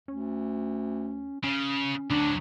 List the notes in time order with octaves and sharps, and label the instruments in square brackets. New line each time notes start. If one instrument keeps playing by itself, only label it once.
[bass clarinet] D2 [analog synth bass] C#4
[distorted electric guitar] C#3 [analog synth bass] C#4
[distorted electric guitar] D2 F#3 [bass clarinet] D4